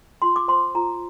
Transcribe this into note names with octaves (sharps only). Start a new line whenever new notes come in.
F4 C6
D6
C5 C6
F4 A#5